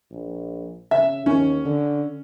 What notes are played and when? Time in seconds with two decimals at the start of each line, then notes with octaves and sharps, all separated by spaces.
0.11 A#1
0.91 C#3 E5
1.26 D#2 C#4
1.65 D3